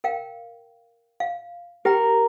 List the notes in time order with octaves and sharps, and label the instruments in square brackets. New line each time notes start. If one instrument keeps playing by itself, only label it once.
[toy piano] A#4 F5 G5
F5
[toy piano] G4 G5 A#5 [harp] A#4